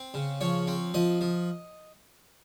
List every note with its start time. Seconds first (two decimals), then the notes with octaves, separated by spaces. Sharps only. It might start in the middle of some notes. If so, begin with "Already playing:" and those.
Already playing: C4
0.14 C#3
0.41 F3 C#5
0.67 C4
0.94 F3 D#5
1.21 F3